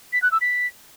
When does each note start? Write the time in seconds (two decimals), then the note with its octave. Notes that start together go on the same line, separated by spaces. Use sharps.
0.13 B6
0.22 F#6
0.32 E6
0.41 B6